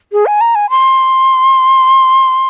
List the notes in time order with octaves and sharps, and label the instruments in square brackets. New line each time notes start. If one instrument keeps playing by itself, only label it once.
[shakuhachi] G#4
G#5
A#5
G#5
C6